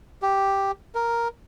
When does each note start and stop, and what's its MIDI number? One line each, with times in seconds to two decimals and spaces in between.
0.22 0.71 67
0.95 1.28 70